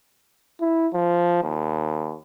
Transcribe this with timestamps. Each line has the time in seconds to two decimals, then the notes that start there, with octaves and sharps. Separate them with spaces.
0.60 E4
0.93 F3
1.43 D#2